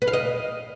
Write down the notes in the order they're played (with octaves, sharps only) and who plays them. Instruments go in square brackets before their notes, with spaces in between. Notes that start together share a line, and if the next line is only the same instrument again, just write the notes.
[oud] B4
F5
D#5